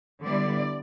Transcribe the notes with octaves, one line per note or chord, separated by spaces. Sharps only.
D3 G3 B3 E4 D5